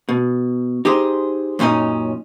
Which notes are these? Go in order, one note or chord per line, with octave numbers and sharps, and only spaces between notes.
B2
D#4 G4 G#4 C5
F#2 A#2 C#4 D#4 D#5